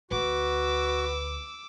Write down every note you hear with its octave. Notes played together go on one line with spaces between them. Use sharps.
D2 F#4 B4 D6 E6